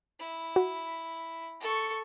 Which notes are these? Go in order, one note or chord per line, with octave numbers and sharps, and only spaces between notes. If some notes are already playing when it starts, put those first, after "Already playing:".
E4
F#4
A4 C#6